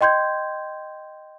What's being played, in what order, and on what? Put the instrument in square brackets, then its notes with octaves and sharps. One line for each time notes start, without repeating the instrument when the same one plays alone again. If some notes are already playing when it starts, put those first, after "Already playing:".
[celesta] D#5 G5 C6 G6 G#6